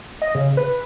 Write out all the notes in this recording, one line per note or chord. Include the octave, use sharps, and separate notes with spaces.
D#5
C#3
B4